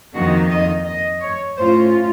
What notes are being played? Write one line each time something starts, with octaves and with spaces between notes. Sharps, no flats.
F2 D#3 A#3 D#4 F#4
D#5
D#5
C#5
A2 A3 C#4 F4 C5